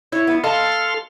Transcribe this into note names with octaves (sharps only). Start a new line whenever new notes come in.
E4 C#5
B3
A4 D#5 F5 A5 C6 F6